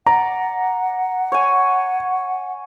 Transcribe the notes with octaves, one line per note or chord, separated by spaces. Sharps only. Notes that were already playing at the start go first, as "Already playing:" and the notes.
D5 F#5 A#5
C#5 G#5